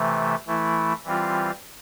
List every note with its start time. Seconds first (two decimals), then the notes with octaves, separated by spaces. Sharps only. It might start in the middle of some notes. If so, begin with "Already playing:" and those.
Already playing: C3 E3 A3
0.47 E3 A3 E4
1.04 E3 G3 C4 F4